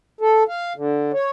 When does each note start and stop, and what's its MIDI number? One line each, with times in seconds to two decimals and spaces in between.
0.21 0.43 69
0.48 0.73 77
0.76 1.12 50
1.13 1.31 73